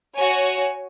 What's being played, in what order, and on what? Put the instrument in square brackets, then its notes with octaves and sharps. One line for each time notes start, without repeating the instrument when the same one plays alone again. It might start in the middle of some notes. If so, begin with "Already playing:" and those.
[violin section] F#4 C#5 G#5